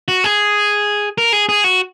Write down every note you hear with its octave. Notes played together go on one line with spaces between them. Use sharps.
F#4
G#4
A#4
G#4
G#4
F#4